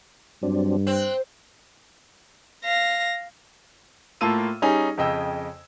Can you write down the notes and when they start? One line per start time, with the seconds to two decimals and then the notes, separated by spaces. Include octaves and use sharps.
0.43 G2 F#3 C4 D4
0.87 C4 F#6
2.65 F5 A#6
4.21 A2 A#3 F4 A5 E6 D#7
4.62 G3 C#4 D#4 G#4
4.98 F2 C#3 D#5 G5 E6